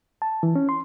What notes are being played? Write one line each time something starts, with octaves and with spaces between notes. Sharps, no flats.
A5
E3
C#4
C6